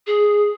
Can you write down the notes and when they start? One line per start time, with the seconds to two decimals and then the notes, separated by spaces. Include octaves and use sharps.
0.07 G#4